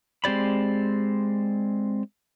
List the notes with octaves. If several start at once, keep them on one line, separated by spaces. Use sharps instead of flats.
G#3 C4 G4 D5 B5